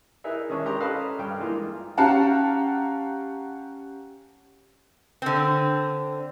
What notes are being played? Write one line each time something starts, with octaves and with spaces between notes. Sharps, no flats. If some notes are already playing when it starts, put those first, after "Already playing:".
D#4 E4 G#4 A#4 B4 E5
D#3 G#3 C#4 D4
G4 A#4 A#5 C6
C#4 A4 B4 D#5 F5 B5
G2 G5
E3 G#3 A#3 D#4 F4
C#4 G4 F5 F#5 A5 A#5
D3 C4